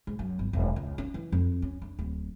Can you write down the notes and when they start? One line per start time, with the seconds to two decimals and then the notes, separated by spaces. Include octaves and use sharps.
0.07 G#2
0.19 F#2
0.39 G1
0.53 E1
0.76 C#2
0.98 C#4
1.14 E3
1.32 F2
1.62 C#4
1.82 D4
1.99 D1